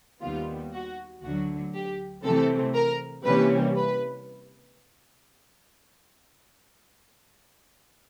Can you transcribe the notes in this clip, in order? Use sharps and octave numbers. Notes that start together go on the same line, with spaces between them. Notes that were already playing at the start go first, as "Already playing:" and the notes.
D#2 D#3 G3 B3 F4
F#4
D2 D3 F#3 F#4
G4
C3 E3 A3 C4 A4
A#4
C3 E3 G3 A#3 C#4 B4
B4